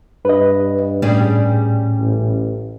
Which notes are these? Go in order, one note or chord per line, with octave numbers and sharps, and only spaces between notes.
G2 B4 D#5
A2 G3 C#4 G#4
A1